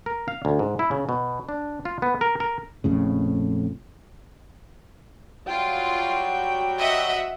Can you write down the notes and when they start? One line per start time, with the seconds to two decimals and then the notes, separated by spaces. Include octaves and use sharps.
0.06 A#4
0.28 F5
0.45 D2
0.59 G#2
0.79 E4
0.91 C#3
1.09 B2
1.49 D4
1.85 F4
2.02 B3
2.21 A#4
2.40 A#4
2.84 A#1 F2 A2 C#3
5.48 F#3 G3 F4 F#4 G5
6.79 D#5 E5 F#5